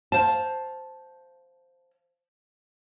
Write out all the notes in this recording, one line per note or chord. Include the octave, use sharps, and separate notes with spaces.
C5 F5 A5